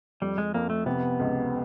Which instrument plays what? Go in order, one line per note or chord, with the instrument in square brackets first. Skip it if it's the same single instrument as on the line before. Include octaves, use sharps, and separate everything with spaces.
[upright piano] F2 [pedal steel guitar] G3
[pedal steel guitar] G#3
[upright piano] F2 [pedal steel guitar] A#3
[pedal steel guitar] A3
[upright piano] C3 [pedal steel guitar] B3
[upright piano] C#2